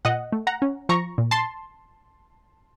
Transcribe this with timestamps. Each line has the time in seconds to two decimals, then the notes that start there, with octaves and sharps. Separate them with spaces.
0.05 A#2 D#5 F#5
0.32 A3
0.47 F#5 A#5
0.62 C#4
0.89 F3 A#5 C#6
1.18 A#2
1.31 A5 C6